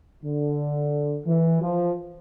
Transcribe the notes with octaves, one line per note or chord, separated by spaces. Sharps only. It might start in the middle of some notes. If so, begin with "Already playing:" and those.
D3
E3
F3